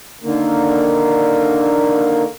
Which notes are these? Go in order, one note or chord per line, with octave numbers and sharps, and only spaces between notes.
D3 D#3 A#3